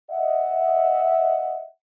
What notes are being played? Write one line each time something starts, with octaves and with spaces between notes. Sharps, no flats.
D#5 E5 F#5